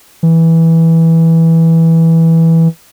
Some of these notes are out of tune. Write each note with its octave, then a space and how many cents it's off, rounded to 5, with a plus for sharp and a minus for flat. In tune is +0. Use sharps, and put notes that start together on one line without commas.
E3 -10